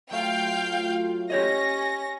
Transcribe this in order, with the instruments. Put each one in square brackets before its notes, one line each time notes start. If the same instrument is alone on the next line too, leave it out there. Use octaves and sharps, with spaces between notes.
[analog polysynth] F#3 A3 F4 [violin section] F5 G5 G6
[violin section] C#4 A#6 [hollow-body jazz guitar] G4 C#5 D#5